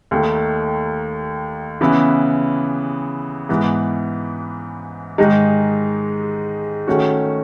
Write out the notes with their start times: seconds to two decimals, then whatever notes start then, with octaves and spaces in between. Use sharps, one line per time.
0.11 D#2 D#3 A3
1.81 C#3 E3 B3 E4
3.49 G#2 E3 B3
5.18 G#2 D#3 G#3 D#4
6.87 D#3 A3 C#4 F#4